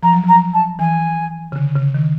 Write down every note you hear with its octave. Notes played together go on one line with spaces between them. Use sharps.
F3 A#5
F#3
F3 A#5
A5
E3 G#5
C#3
D3
C#3
D#3